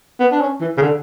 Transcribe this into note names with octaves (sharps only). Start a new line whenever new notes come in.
B3
D4
C#4
E3
C#3
D3